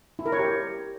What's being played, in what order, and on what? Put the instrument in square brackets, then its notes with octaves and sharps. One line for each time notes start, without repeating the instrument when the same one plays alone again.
[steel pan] E4
A#4
C#5
G4